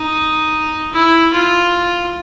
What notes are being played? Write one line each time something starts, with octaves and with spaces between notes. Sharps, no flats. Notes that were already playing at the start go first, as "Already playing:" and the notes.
Already playing: D#4
E4
F4